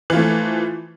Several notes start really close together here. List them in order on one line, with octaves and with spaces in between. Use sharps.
E3 F4 A3 F3